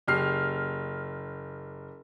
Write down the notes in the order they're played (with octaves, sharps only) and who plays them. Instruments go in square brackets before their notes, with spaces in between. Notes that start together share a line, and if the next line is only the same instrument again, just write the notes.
[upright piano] F#1 G4 F6 C7